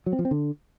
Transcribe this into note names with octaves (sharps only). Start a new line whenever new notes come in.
F#3
C4
F3
C4
D3